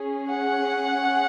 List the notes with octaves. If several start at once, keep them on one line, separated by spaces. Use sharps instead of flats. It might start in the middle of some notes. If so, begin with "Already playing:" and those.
Already playing: C#4 G#4
F#5